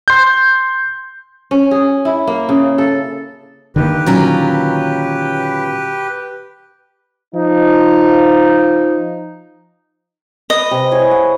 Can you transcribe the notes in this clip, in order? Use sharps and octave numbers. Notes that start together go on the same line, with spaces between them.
C6 G6
C#4
G#4
E4
A#3
C#3
A4
D3 D#3 A#3 G4 B4
A#2 F#3 C#4
F3 D#4
B4 D#5
C3
E4 G#4 C#5
F#5